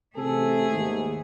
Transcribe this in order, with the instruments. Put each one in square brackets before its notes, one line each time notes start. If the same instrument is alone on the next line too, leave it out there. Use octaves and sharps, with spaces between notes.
[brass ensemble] A1 C3 A4 [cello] A3 G#4
[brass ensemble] D#2 G#2